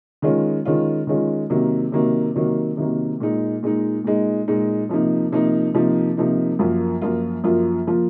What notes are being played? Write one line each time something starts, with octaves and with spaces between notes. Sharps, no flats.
D#3 G#3 C#4 F4
D#3 G#3 C#4 F4
D#3 G#3 C#4 F4
C3 D#3 F#3 A#3
C3 D#3 F#3 A#3
C3 D#3 F#3 A#3
C3 D#3 F#3 A#3
A#2 G#3 D#4
A#2 G#3 D#4
A#2 G#3 D#4
A#2 G#3 D#4
C3 F3 A#3 D#4
C3 F3 A#3 D#4
C3 F3 A#3 D#4
C3 F3 A#3 D#4
F#2 F3 A#3 F4
F#2 F3 A#3 F4
F#2 F3 A#3 F4
F3 A#3 F4